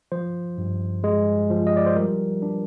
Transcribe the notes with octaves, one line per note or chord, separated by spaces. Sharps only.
F3 C5
G2
G#3
F3
D#5
D5
C5
G3 A#4
D4